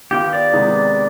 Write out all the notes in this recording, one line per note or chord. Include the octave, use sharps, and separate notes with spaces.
D#3 B3 F4 G4
D5
C3 D#3 G#3 B3 D#4